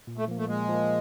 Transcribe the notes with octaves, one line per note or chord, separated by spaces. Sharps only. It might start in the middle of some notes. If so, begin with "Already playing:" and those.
A#2
A3
F3 A#3
A3
A#2 G#3
F3 A#3